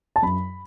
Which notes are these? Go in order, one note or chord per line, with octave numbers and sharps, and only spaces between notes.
A5
F#2 B5